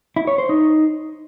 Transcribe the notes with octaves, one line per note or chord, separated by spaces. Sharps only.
E4
C#5
C5
D#4